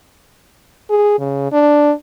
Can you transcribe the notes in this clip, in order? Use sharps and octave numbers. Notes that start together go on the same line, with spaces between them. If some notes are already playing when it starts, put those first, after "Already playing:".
G#4
C#3
D4